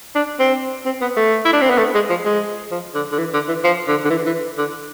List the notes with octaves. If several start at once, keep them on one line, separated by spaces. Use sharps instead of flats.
D4
C4
C4
B3
A3
E4
D4
C4
B3
A3
G#3
F3
G#3
F3
D3
D3
E3
D3
E3
F3
D3
D3
E3
E3
D3